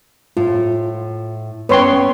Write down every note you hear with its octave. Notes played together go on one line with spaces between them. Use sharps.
A2 F4
B3 C#4 B4 C#5 G5 C6